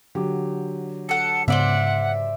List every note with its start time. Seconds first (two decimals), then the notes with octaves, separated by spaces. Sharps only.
0.15 D3 F#3 G4
1.09 A4 F#5 C#7
1.48 G#2 C#3 B3 C5 D5 E5 F#5